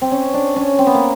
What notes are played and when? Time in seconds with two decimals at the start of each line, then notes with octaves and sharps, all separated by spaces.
0.02 C4
0.12 C#4
0.34 D4
0.56 C#4
0.79 C4
0.87 B3
0.94 A#3